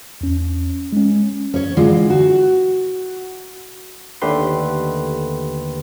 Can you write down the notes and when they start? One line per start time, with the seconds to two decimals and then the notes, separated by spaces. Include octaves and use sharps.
0.21 E2 C#4
0.93 G#3 C#4
1.54 C#4 C#5
1.77 D3 E3 G#3 F4
2.10 F#4
4.22 D#2 D3 A3 G4 B4 C6